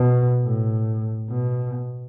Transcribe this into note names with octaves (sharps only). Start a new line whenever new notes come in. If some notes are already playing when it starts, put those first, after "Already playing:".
Already playing: B2
A2
B2